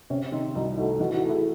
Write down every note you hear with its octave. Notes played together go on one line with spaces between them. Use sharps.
C3 C#4
D#3 C4 D#4
C2 D#4 F#4
A3 D#4 F#4
E3 D#4 F#4
D#4 F#4
A3
E4 G#4